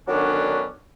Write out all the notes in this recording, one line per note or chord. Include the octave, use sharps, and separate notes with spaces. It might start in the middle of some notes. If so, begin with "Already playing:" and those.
D3 D#3 F#3 B3 C#4 D4